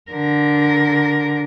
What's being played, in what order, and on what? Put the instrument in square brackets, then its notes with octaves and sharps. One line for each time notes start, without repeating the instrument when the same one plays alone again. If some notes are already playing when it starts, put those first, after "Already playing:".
[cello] D3 A#4